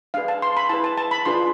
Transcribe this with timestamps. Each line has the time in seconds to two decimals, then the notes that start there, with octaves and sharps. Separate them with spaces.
0.14 D4 G#4 B4 F5
0.28 A5
0.42 C6
0.57 B5
0.69 E4 G#4 B4 A5
0.84 A5
0.98 A5
1.11 B5
1.25 D4 F4 G#4 B4 C6